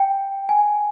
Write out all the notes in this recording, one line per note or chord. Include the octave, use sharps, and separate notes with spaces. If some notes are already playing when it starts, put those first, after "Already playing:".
Already playing: G5
G#5